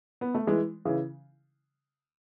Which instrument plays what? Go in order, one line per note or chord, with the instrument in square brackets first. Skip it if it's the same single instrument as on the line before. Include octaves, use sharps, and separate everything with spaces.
[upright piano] B3
A3
E3 G#3
C#3 E3